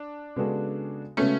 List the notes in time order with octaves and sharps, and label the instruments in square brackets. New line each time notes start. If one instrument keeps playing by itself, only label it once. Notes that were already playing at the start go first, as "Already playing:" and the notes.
Already playing: [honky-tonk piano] D4
[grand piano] C#3 G#3 B3 F#4 A4
[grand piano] C#3 G#3 B3 F#4 A4 [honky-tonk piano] A3 C#4